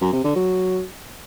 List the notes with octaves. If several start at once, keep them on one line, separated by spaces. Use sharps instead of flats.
F#2
C3
D3
F#3